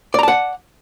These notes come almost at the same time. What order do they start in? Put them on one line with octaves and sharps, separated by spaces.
D5 A#5 A5 F#5